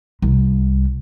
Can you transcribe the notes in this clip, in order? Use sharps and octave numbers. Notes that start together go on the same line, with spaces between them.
C2